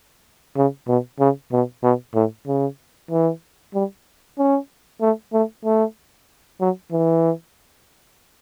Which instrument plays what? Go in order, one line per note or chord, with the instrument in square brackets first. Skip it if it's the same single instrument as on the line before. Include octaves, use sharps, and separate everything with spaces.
[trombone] C#3
B2
C#3
B2
B2
A2
C#3
E3
G3
C#4
A3
A3
A3
F#3
E3